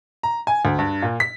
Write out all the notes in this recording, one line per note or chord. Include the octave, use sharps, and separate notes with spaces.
A#5
G#5
D2
G2
A#2
B6